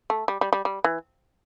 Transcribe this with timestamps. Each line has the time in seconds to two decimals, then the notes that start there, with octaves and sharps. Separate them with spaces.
0.10 A3
0.28 G3
0.41 G3
0.53 G3
0.65 G3
0.84 E3